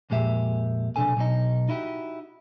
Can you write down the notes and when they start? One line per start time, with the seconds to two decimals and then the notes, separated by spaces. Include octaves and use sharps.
0.10 F2 A#2 G#3 G4 E5
0.96 B1 E2 C3 D4 A4 G#5
1.17 B1 B2 D#4
1.69 D#4 E4 F#4 G4